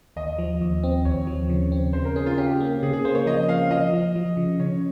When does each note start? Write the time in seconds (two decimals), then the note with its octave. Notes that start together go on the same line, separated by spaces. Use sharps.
0.16 D#2 D#5
0.38 F3
0.61 D#2
0.84 C4
1.05 D#2 C#5
1.27 F3
1.50 C#3
1.72 C4
1.93 C#3 C5
2.05 A#4
2.16 C#4 G#4
2.26 F4
2.38 C#4 G4
2.60 A#3
2.83 C#3 G#4
2.93 G#4
3.05 A#3 C5
3.15 C#5
3.26 F3 D#5
3.49 A#3 F5
3.70 F3 D#5
3.93 F3
4.16 F3
4.37 C#3
4.60 C#3 C#5